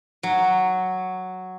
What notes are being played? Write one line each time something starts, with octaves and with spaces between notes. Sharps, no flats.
F#3